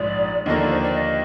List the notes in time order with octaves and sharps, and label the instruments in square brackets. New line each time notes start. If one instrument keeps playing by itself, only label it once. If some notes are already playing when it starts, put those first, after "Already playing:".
Already playing: [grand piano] A#1 G#2 F3 G#3 [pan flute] D5
[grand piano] D#2 D3 F3 A#3 [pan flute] D#5
[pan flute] D5
C5
D5
D#5